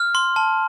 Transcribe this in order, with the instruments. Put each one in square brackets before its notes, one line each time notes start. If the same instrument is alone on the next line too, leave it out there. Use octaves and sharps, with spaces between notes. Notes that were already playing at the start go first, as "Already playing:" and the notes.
Already playing: [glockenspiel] F6
C6
A5